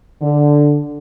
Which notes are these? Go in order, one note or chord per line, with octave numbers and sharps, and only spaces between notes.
D3